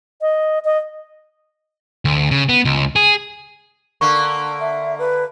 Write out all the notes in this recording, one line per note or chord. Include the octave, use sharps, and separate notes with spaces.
D#5
D#5
D2
C#3
B3
C#2
G#4
D3 A#3 C#6
E5
B4